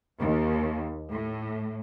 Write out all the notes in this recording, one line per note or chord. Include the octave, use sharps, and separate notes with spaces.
D#2
A2